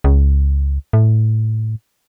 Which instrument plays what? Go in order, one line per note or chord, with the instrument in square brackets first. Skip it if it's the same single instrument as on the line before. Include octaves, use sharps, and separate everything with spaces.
[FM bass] C#2
A2